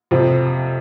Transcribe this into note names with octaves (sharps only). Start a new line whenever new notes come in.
F2 C3 F3